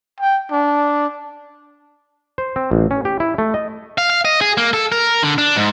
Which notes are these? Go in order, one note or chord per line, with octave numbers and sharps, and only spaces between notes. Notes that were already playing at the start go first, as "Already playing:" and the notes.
G5
D4
C5
C4
A1
C#4
G4
E4
A3
D#5
F5
F5
D#5
G#4
A#3
A4
A#4
D3
D4
G#2